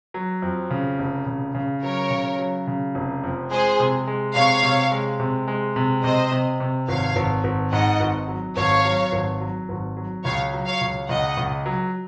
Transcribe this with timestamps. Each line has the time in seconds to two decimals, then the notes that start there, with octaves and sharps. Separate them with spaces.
0.14 F#3
0.42 F2
0.71 C#3
0.99 F1
1.27 C#3
1.55 C#3
1.83 F#3 A#4 C#5
2.11 C#3
2.39 F#3
2.67 C#3
2.95 F1
3.24 F2
3.51 G#3 G#4 C5
3.79 C3
4.07 G#3
4.35 C3 C#5 F5
4.63 C3
4.92 G#3
5.20 C3
5.48 G#3
5.76 C3
6.04 C3 C5 D#5
6.32 C3
6.60 C3
6.88 G#1 C#5 F5
7.16 G#1
7.44 G#1
7.72 G#2 D#5 F#5
8.00 G#1
8.28 F#3
8.57 G#1 C#5 F5
8.85 F#3
9.12 G#1
9.41 F#3
9.69 G#1
9.97 F#3
10.24 C#2 C#5 F5
10.53 F#3
10.67 C#5 F5
10.81 C#2
11.09 C#2 D#5 F#5
11.37 C#2
11.66 F#3